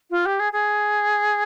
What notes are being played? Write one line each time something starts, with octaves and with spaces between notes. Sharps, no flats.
F4
G4
G#4
G#4